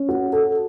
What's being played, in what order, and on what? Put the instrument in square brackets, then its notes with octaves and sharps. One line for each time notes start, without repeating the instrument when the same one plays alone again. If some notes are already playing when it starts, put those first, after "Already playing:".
Already playing: [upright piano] C#4
F#4
A4